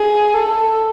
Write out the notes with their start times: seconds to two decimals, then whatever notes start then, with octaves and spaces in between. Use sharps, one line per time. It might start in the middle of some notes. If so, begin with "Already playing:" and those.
Already playing: G#4
0.34 A4